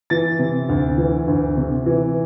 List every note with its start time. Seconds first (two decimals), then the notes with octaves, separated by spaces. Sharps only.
0.10 E3 A6
0.39 C3
0.69 D2
0.98 E3
1.27 D2
1.57 C3
1.86 E3